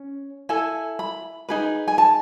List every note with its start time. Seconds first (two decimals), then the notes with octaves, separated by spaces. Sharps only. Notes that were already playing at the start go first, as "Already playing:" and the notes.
Already playing: C#4
0.49 E4 A4 G#5
0.99 B5
1.49 D#4 G#4 B4
1.88 G#5
1.98 A5